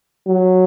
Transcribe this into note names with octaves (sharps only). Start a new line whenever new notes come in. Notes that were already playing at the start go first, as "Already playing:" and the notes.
F#3